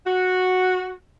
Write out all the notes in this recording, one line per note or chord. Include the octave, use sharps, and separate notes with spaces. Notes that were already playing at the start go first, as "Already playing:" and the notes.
F#4